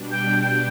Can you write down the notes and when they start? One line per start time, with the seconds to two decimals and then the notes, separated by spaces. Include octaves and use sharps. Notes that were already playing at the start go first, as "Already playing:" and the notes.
Already playing: B2 G3 D4
0.11 G5
0.38 G5